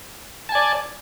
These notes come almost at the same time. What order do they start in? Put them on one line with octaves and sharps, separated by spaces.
A5 G#5 D5